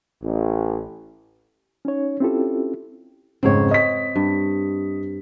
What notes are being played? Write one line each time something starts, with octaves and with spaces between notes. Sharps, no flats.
A1
C#4 D#4 C#5
C4 C#4 E4 F4 G4 A4
F2 G#2 C#3 C4 C#5
D#5 B6
G2